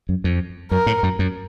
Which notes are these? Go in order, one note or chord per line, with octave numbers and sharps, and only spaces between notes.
F#2
F2
F#2 A#4
A2
F#2
F#2